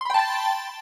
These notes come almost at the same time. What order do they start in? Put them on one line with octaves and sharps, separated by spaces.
C6 B5 G5 A5 A6